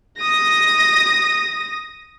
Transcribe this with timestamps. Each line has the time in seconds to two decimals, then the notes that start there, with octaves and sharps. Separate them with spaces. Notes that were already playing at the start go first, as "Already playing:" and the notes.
0.19 D#6 A#6